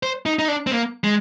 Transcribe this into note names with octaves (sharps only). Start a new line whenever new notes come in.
C5
D#4
D#4
D4
C4
A#3
G#3